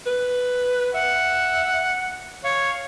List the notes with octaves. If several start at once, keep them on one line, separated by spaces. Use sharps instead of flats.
B4
E5 F#5
C#5 F5